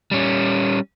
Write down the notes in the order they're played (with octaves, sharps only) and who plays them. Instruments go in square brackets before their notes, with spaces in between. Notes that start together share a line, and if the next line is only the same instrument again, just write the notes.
[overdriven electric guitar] G3 C#4